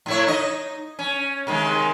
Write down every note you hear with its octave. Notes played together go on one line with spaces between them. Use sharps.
A2 E4 C#5
D#4 D#5
C#4
C3 D#3 G#3